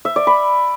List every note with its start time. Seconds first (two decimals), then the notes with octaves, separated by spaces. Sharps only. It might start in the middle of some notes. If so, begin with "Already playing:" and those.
0.05 E5
0.16 D5
0.27 B5